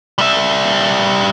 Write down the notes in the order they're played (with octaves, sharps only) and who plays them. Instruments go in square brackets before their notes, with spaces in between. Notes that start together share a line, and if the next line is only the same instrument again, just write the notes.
[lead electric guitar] G3 E5